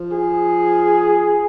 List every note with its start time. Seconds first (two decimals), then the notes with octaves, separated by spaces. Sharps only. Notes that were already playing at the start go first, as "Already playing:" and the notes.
Already playing: F3
0.13 G#4